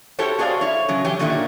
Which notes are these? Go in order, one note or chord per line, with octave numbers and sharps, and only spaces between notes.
E4 F#4 G4 A4 C5 C#5
F#4 G#4 C5 D5 F5
E4 C#5
C#3 F#3
E3 G4 C#5 G5 G#5
A#2 D3 D#3 A#3 E5